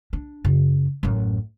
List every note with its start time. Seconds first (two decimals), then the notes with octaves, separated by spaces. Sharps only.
0.13 D4
0.45 F#2 C#3
1.03 A1 F#2